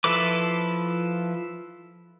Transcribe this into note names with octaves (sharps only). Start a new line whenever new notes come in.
F3 E4 A4 B4 D6